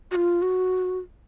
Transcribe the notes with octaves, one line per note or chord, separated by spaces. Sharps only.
F#4
F4
F#4